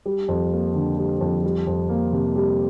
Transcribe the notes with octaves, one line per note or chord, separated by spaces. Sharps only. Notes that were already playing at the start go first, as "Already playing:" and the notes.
G3
F2
A#3
D3
G3
F2
G3
F2
A#3
C3
G3